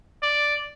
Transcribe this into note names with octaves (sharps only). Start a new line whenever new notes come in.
D5